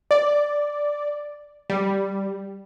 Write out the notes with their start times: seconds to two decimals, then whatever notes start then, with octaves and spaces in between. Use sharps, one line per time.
0.11 D5
1.70 G3